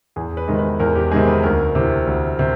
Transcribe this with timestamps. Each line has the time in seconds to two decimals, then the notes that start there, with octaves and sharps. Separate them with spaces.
0.16 E2 G#4
0.37 B4
0.48 C3 D#3 G#3
0.59 B4
0.79 E2 A#4
0.96 G4
1.12 C3 D#3 G#3 G#4
1.28 B4
1.43 D2 A#4
1.75 C3 E3
2.07 D2
2.39 C3